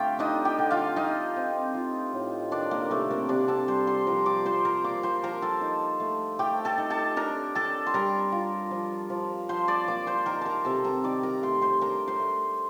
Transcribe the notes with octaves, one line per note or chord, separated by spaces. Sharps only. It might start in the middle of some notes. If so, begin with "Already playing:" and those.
Already playing: D3 A3 F4 G4 F5 G5
D4 D#4 D#5
G4 G5
D3
F4 F5
D#4 F4 D#5
C4
F4
A2
D#3 D4 D5
A#3 A#4
C3 A3 A4
A#3 A#4
C3 D4 D5
A4 A5
G3 C5 C6
C5 C6
F3 A#4 A#5
D5 D6
F3 C5 C6
A#4 A#5
A#3 D5 D6
C5 C6
F3 A#4 A#5
A4 A5
D#4
A3
A3 G4 G5
A4 A5
D#4
A4 A5
D4 A#4 A#5
D4 A4 A5
C6
G3 A#4 A#5
F4
F3
F3
F3 C5 C6
D5 D6
A#3 D5 D6
C5 C6
D#3 A#4 A#5
A#4 A5 A#5
C3 A4 A5
A#4 A#5
D#3 D5 D6
A#4 A#5
A3 C5 C6
C5 C6
D4 A#4 A#5
C5 C6
A3